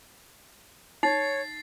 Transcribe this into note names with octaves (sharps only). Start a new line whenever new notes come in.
D#4 C#5 A6 C7